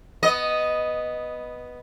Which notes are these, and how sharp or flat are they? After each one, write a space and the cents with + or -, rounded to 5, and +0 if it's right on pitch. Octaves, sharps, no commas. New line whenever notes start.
B3 +0 D#5 +0